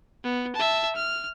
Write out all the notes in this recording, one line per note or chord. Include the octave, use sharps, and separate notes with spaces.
B3
E5 A5
F6